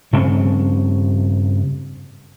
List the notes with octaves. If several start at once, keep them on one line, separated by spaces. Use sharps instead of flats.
G2 C#3 C4 C#4